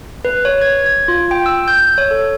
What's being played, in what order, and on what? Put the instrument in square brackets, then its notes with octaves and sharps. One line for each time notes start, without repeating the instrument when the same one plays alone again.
[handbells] B4
C#5
G#6
G#6
F4
G5
E6
G6
C#5
A4